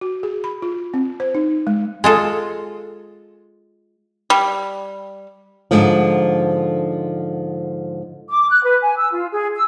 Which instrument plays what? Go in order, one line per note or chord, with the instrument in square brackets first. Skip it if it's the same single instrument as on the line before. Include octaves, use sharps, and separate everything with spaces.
[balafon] F#4
G#4
B5
F4
C4
C5
D#4
G#3
[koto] G#3 F4 A4
[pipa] G3
[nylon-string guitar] G#2 D3 F3
[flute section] D6
F#6
B4
G#5
E6
F4
G#4
E6